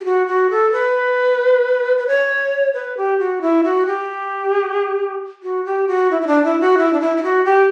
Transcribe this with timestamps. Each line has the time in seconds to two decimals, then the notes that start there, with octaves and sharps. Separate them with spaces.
0.01 G4
0.05 F#4
0.27 F#4
0.51 A4
0.72 B4
1.98 B4
2.07 C#5
2.74 B4
2.97 G4
3.19 F#4
3.41 E4
3.64 F#4
3.86 G4
5.43 F#4
5.65 G4
5.88 F#4
6.11 E4
6.22 E4
6.27 D4
6.44 E4
6.60 F#4
6.78 E4
6.93 D4
7.00 E4
7.17 E4
7.23 F#4
7.45 G4